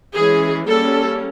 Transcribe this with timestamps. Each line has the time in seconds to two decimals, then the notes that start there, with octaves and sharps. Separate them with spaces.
0.15 E3 G#3 C#4 G#4
0.68 G3 A#3 C#4 A4